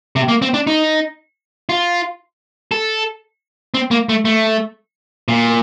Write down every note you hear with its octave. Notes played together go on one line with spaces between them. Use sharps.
C3
A#3
C4
D4
D#4
F4
A4
C4
A#3
A3
A3
A#2